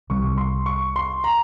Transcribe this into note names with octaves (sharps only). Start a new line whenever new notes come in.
C2 C3 G3 C#6
C6
C#6
C6
A#5